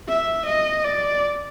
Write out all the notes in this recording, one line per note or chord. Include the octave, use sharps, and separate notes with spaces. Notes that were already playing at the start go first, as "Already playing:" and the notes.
E5
D#5
D5